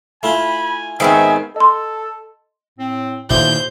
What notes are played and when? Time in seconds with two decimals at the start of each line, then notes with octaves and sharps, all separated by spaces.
0.23 A3 E4 F4 G#5 B5
1.00 G#2 D#3 B3 C4 E5 F5 G#5
1.56 A4 D#5 C6
2.79 A2 C4
3.30 D2 A#2 D#3 E3 E4 C5 G6